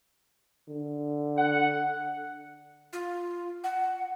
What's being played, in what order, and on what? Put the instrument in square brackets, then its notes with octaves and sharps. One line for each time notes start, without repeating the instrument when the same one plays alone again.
[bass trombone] D3
[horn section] F#5
[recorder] F4
F#5